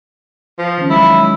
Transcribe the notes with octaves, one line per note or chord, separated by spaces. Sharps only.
F3
D#3 C#4
F#3 G#3 E4